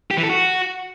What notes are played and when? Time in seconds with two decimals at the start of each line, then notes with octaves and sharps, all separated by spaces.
0.11 G4
0.17 E3
0.23 A4
0.30 F#4